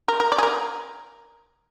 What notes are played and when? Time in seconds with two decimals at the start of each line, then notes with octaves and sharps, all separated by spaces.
0.08 A#4
0.20 A#4
0.32 D5
0.38 G#4
0.43 A#4